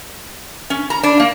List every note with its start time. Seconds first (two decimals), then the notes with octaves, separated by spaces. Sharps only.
0.70 C#4
0.90 A#5
1.03 D4
1.20 A#3